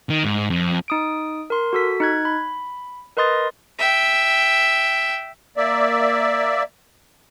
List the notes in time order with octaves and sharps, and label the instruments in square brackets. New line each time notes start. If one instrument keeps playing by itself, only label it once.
[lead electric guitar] D#3
G#2
F2
[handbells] D#4 D#6 D7
A#4 C6
F#4 A4 B6
D#4 F#6 G#6
B5
A#4 B4 D#5 C6 D#6 A6
[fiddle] E5 G5
[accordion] A#3 D5 E5